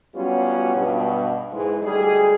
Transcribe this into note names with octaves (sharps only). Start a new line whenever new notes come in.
F#3 G3 B3 C#4 F4 F#4
G2 B2
G#2 E3 G#3
D2 G3 G#3 G#4